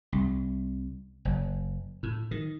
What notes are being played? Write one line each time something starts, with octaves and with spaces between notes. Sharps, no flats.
C2
F#1
A2
D#3